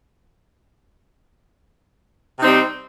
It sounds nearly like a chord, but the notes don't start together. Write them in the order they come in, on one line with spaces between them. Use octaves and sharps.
C3 D#4 C4 G3